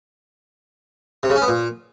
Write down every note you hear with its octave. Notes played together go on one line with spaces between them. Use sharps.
C3
C#3
C#4
B3
A#2